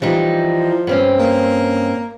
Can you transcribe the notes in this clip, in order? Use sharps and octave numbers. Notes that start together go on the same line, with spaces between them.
E3 F3 G3 D#4
G2 C4 C#4
A#3